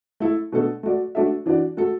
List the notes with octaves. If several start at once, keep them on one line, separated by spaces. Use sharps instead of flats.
A3 E4 A4
B2 A3 D4 A4
A3 F#4 D5
A3 D4 F#4 A4 E5
E3 D4 F#4 D5
A3 F#4 A4